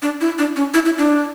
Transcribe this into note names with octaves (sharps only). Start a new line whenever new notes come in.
D4
E4
D4
C#4
E4
E4
D4